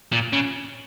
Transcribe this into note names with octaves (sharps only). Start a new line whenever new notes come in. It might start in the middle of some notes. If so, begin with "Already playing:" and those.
A#2
C#3